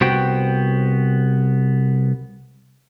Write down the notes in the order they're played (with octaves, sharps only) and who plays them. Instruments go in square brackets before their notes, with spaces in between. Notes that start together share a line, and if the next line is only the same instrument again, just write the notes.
[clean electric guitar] C2 B3 F#4 C5 G5